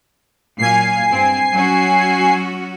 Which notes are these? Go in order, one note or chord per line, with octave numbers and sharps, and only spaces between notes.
A#2 F#3 F5 G#5 C7
G2 C4
F#3 C#4 F#4